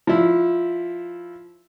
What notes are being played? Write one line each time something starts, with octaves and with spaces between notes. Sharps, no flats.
F3 E4